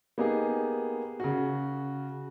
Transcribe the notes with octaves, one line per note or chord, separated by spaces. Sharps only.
A#3 B3 D#4 G4 G#4
C#3 F#4